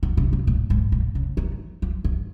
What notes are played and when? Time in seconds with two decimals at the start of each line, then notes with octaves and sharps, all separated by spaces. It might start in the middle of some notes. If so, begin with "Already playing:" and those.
0.03 D#3
0.17 C#3
0.33 C#3
0.47 A#2
0.70 G#2
0.92 A#2
1.15 C#3
1.37 D#3
1.82 F3
2.04 D#3